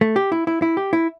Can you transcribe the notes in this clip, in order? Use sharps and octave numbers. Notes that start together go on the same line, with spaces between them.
A3
G4
E4
E4
E4
G4
E4